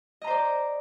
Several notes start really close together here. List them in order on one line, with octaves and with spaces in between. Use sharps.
D#5 A#5 C5 D5